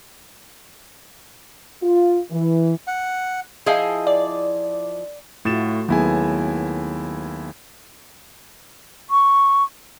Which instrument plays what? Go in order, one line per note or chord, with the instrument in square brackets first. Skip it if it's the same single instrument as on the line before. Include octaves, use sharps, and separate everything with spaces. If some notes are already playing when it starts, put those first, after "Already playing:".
[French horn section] F4
E3
[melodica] F#5
[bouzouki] F3 E4 D#5 [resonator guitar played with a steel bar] G#4 F5 G#5
[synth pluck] D5
[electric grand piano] A2 A6 E7 [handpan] A3 F4 F#4
[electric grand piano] D#2 E4 G#5 [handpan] F#3 B3 G#4
[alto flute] C#6